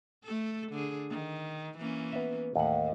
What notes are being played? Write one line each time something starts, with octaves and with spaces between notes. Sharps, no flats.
A3 A4
D3 G#4
D#3
E3 A#3 C#4
B3 E5
D#2 A2 F#5